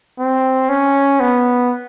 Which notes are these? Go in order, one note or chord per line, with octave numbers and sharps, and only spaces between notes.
C4
C#4
B3